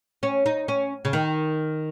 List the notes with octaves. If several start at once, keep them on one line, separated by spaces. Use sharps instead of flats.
C#4
D#4
C#4
C#3
D#3